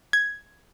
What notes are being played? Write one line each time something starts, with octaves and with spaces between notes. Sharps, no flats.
G#6